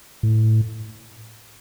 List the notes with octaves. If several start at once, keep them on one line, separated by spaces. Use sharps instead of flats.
A2